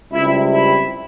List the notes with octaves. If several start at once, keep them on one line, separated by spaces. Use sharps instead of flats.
C#2 C3 G3 E4
E4